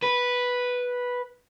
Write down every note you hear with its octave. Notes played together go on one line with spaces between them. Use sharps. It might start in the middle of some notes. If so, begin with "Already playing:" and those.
B4